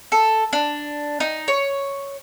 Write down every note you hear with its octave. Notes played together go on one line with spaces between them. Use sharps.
A4
D4
D#4
C#5